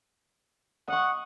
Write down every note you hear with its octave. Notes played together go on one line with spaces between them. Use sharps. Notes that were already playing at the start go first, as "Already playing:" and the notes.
D#5 F#5 C#6